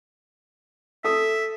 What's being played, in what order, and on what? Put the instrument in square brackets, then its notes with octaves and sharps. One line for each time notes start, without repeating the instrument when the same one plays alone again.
[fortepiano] A4 D#6 [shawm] E5